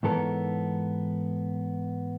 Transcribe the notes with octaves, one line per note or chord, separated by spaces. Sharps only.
G#2 E3 B3 A4 A#4 C#5